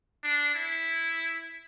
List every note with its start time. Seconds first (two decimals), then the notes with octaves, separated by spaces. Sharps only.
0.24 D4
0.54 E4